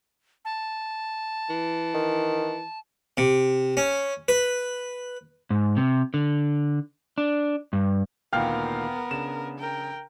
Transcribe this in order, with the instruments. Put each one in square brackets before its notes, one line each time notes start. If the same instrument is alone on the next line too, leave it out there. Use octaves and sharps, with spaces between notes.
[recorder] A5
[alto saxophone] E3
[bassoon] D#3
[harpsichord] C3
C#4
B4
[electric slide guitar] G#2
C3
D3
D4
G2
[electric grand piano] D2 A#2 D#3 [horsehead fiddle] B3 A#4 [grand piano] F5 G5 F6
[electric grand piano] C#3 D4 [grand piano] E7
[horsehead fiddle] A#4 G5